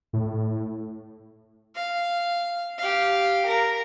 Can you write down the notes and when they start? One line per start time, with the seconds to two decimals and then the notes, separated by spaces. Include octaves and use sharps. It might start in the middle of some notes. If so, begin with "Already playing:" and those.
0.13 A2
1.75 F5
2.78 G4 F5
3.45 A#4 A#5